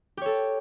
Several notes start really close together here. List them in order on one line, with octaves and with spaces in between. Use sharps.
G4 C#5 A4